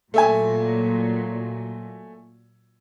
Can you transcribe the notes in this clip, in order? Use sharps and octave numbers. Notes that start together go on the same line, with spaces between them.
A#2 F#3 A3 E5 G#5